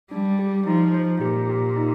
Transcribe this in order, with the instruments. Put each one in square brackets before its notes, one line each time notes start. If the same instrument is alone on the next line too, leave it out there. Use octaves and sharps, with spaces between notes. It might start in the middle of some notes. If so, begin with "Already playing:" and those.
[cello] G3 [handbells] D4
[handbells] G4
[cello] F3 [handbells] D#4
[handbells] C5
[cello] A#2 [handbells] G4
[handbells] G4
D#4